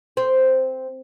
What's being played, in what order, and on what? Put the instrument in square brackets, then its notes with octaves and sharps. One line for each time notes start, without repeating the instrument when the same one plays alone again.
[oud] C4